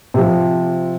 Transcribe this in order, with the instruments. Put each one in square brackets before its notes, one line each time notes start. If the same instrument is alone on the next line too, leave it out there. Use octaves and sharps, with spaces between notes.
[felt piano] C3 F3